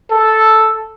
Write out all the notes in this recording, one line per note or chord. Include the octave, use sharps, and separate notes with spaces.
A4